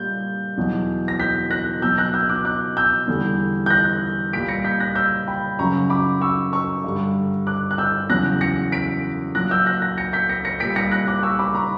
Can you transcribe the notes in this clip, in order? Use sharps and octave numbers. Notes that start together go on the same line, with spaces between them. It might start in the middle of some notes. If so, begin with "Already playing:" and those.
Already playing: A#2 G3 G6
E2 B2 F#3
A#6
G6 B6
F#6 A#6
B2 F#3 E6 G6
F#6 A#6
E6 G6
D6 F#6
D6 F#6
E6 G6
E2 D3 G3
G6
F#6 A#6
A#2 G3 B6 D7
A#6 C#7
G6 B6
F#6 A#6
E6 G6
G5 B5
F#2 C#3 F#3 A#5 C#6
B5 D6
C#6 E6
C#6 E6
G2 D3 G3
D6 F#6
F#6
E6 G6
E2 C#3 F#3 F#6 A#6
A#6 C#7
B6 D7
A#2 F#3 F#6 A#6
E6 G6
F#6 A#6
F#6 A#6
A#6 C#7
G6 B6
A#6 C#7
A#6 C#7
A#2 G3 B6 D7
A#6 C#7
F#6 A#6
D6 F#6
C#6 E6
B5 D6
A#5 C#6